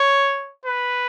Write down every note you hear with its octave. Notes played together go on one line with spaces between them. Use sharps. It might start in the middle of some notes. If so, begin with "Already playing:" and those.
Already playing: C#5
B4